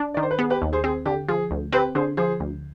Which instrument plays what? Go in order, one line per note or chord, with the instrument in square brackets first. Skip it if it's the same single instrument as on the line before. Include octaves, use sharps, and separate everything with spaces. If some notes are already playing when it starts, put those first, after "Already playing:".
Already playing: [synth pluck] D4
[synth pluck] D#3 [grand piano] D5
[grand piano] C5
B4
[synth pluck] B3 [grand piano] G#4
[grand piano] G4 B4
[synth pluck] D#2
[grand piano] G#4 C5
[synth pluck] C4 [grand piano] G#4
[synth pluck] D3 [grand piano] G4
[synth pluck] F3 [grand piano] G#4
[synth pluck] D2
[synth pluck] C4 [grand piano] G4 B4
[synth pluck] D3 [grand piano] G#4 C5
[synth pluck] F3 [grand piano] G#4 C5
[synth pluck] D2